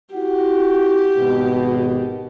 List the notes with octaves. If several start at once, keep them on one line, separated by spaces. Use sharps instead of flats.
E4 F#4 G4 F#5
G#1 B2